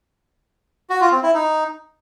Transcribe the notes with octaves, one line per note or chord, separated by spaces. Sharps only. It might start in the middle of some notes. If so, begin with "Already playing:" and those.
F#4
F4
C4
E4
D#4